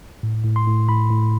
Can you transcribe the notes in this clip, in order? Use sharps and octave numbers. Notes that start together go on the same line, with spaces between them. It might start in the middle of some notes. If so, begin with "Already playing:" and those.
A2
A2
C6
A2
A2 B5
A2